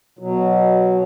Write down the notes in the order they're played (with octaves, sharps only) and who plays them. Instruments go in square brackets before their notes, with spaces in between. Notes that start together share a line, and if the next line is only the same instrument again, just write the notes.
[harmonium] B2 F#3